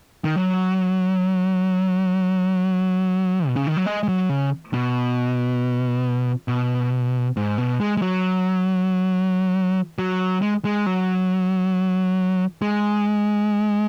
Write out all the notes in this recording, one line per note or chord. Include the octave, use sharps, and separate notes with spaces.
D#3
F#3
B2
C#3
D#3
F#3
G#3
G#3
F#3
C#3
B2
B2
G#2
B2
G#3
G#3
F#3
F#3
G#3
G#3
F#3
G#3